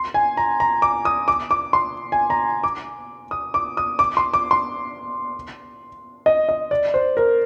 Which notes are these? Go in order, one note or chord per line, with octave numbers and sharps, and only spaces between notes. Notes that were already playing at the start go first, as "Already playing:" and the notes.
Already playing: C6
G#5
A#5
A#5
D6
D#6
D6
D6
C6
G#5
A#5
D6
D#6
D6
D#6
D6
C6
D6
C6
D#5
D#5
D5
C5
A#4